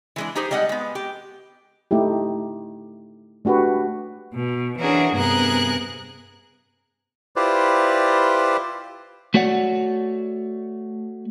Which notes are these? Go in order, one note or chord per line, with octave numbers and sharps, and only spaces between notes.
E3 G#3 D4
D#4 G4 G#4 C5
G3 G#3 D#5 F5 F#5
G#3 B3
G4
A3 D#4 E4 G4
A3 D4 F#4 G4 B4
B2
E3 C#4 D4 F#4 G#4 A#4
G2 C3 B3 G#4 A#4 F#6
E4 F4 G4 B4 C5 D5
A3 F#4 C#5 D5 F#5